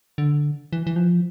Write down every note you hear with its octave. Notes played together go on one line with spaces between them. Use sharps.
D3
E3
E3
F3